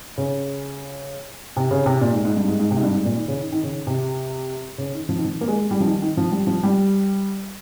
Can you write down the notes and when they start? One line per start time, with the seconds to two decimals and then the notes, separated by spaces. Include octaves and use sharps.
0.18 C#3
1.56 C3
1.71 C#3
1.86 C3
2.01 A#2
2.13 G#2
2.25 G#2
2.37 G2
2.48 G#2
2.60 G#2
2.71 C3
2.77 G#2
2.83 G2
2.94 G#2
3.05 A#2
3.17 D#3
3.28 C#3
3.40 D#3
3.52 D#3
3.63 C#3
3.87 C3
4.78 C#3
4.94 D#3
5.09 F3
5.18 D#3
5.24 F3
5.41 A#3
5.48 G#3
5.71 G3
5.80 F3
5.86 D#3
6.02 D#3
6.17 F3
6.32 G3
6.47 F3
6.63 G3